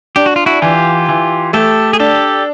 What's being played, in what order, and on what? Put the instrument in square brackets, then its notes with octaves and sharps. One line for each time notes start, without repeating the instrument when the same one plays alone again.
[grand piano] D4 [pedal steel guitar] G4
[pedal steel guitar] F#4
F4
E4 F#4
[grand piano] E3 [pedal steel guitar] F4 G4
[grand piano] E3
[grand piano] A3 [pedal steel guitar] G4 A4
[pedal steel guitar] G#4
[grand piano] D4 [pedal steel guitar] G4 A4